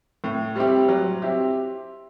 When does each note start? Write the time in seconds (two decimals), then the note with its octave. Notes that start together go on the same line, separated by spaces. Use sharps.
0.24 A2
0.56 G3 C4 E4 G4
0.89 F#3
1.22 C4 E4 G4